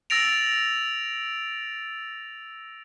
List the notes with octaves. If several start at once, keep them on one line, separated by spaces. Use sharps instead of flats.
E6 A6 A#6 D7 F7